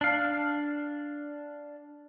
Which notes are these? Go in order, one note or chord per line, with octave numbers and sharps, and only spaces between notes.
D4 F5